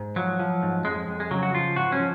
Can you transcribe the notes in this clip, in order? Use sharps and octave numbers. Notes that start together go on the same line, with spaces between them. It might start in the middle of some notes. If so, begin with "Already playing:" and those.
Already playing: G#2
F3 F#3
F3
G#2
F2 G#3
F2
G#3
C#3 F#3
F#4
F3 F4
G#2 F#4
C#4
F3